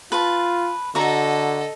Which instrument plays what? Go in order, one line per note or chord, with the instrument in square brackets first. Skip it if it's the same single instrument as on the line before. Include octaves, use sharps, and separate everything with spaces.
[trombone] F4 [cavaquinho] B4 A5
[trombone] D3 [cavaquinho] F#4 A#5 [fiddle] A4 D#5